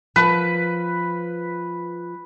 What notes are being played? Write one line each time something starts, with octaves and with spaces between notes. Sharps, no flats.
F3 B4